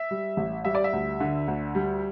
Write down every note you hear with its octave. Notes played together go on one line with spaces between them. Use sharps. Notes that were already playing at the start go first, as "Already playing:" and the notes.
Already playing: E5
G3
A1
G3 E5
D5
E5
D2
D3
D2
G3